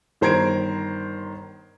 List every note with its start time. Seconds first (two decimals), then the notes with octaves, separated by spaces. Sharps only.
0.21 G1 D#3 C5 A#5 G#6 D7